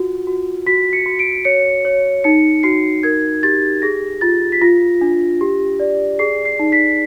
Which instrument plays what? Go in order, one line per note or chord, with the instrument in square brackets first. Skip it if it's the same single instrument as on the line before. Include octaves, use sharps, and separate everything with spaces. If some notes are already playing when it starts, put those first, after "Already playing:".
Already playing: [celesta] F4 F#4
F#4
F#4 B6
C#7
F#4
D7
C#5 C#7
C#5
D#4 C#7
F#4 C7
A#4 G#6
G4 A6
G#4 A#6
F4 A6
B6
F4 A#6
D4
G4
D5
G#4 C7
C7
D#4
B6